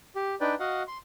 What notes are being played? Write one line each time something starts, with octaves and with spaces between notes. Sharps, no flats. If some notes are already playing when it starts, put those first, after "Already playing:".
G4
D4 D#4 B4 D5 G5
F#4 D#5 F5 F#5
C6